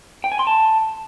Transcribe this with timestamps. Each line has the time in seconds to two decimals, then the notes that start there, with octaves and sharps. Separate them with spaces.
0.24 G5
0.32 G#5
0.39 C6
0.47 A5